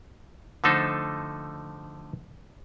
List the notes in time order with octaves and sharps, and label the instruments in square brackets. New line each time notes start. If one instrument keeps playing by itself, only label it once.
[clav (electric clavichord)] D3 F3 A3 D#4 A4 C5